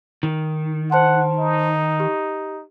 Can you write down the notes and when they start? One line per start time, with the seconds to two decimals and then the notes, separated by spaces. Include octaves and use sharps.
0.23 D#3
0.91 C5 F#5 A5 C6
1.38 D#4
2.00 G4